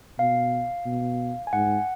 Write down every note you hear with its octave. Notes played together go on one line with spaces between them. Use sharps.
B2 F5
B2
G#5
G#2 F#5